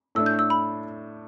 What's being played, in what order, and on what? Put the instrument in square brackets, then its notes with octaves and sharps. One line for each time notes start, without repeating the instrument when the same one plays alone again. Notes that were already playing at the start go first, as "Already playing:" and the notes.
[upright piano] A2 A3 D4 [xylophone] E6
[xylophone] G6
E6
B5